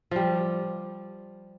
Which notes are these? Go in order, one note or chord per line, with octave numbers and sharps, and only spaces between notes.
F3 G3